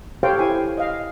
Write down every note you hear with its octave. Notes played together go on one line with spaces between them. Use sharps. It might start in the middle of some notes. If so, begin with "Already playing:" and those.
G4 A4 C5 C#5 F5 G5
E4 G#5
D#5 F5